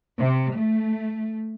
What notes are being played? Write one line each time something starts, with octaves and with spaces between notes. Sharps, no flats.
C3
A3